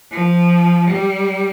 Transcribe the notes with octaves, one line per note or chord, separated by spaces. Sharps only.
F3
G3